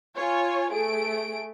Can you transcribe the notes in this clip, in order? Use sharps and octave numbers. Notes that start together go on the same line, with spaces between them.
F4 C#5 G#5
A3 G#4 D7